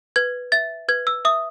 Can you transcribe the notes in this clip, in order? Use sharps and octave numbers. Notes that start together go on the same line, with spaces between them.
B4 G#6
E5 A6
B4 G#6
E6
E5 D#6